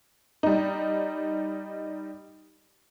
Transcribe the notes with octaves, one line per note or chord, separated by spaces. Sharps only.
G3 D#4